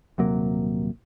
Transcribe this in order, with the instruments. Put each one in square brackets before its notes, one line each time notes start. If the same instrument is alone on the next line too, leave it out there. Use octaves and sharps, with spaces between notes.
[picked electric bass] D#1 C3 F#3 A#3